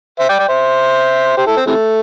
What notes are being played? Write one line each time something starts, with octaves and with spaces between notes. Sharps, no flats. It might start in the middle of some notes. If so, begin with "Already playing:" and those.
C5 E5
D5 G5
D5 G5
C5 E5
G4 C5
E4 A4
C4
C3 E3 A3